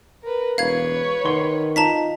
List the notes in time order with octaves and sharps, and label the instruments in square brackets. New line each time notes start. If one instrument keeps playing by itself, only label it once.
[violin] A#4 B4
[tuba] E1 [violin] B4 C#5 [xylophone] F5 G#6
[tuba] D#3 [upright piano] F#5 C6 G7
[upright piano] D#4 F4 [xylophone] A5 A#5 B6